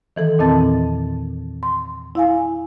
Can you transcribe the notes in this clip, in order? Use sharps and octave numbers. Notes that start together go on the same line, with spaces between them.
D#3 E3 A4
E2 A#2 D#3 C4 A5 A6
C6
E4 F5 G#5